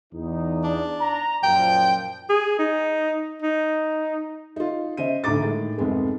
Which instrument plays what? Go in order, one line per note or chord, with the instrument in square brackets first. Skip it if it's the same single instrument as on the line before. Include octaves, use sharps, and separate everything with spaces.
[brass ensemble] E2 D#4
[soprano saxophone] D4
[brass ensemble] A#5
[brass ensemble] F#2 A#2 F3 [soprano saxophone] G5
[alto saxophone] G#4
D#4
D#4
[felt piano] D#4 F4
C#3 C5 D#5 E5 D#7
D2 A2 D3 A#5 D6 A6
A2 D#3 G#3
C2 F2 G#2 G#3 B3